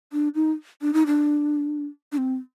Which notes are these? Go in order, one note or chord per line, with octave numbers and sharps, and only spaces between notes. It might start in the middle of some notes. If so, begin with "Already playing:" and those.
D4
D#4
D4
D#4
D4
D4
C4